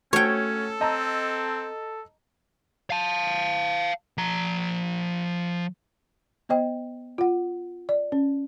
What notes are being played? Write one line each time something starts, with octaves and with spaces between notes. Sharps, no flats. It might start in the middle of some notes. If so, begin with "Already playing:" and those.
A3 C#4 F#4 A4 C#5 G5
C4 D#5 A5 A#5
F5 A5
F3 A#5
B3 C5 D#5 G5
F4 F#5
D5
C#4